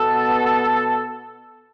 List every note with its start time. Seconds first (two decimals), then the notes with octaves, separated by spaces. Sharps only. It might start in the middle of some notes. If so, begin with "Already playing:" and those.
Already playing: B2 B3 A4